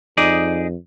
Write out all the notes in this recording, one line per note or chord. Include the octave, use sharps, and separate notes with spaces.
F2 D#4 G#4 D5